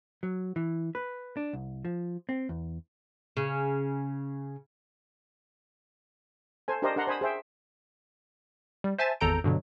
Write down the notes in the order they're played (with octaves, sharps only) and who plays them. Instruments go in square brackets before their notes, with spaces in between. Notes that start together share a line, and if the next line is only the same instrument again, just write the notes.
[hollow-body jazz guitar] F#3
E3
B4
D4
C2
F3
C4
E2
[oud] C#3
[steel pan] A4 C5 G#5
D4 G4 A#4 C5 D5 D#5
D4 A#4 F#5 A#5 C6
C5 G#5 B5 D#6
G#4 C5 E5 G5
[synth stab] G3
C5 E5 G#5 A5 A6
G#1 E2 A4 A#5 G6 D7
G2 B2 D3 F#3